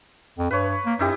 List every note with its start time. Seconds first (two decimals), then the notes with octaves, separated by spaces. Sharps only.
0.38 F2
0.51 G2 B4 C#5
0.86 A#3
0.99 F#2 D#4 E4 G4